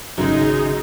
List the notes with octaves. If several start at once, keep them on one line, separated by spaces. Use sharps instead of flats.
G#1 F#2 C#3 G#3 D#4 G#4